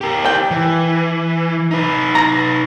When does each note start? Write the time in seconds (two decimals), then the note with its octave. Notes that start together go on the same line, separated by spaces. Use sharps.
0.01 G4 A#4
0.25 G5
0.51 E3
1.71 D#4 B4
2.15 A#5